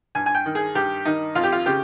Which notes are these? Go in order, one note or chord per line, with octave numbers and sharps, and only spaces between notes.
G2 G#5
G#5
G5
D#3
G#4
G2 G4
D#3 D#4
F2 F4
G4
F4
C#3 G4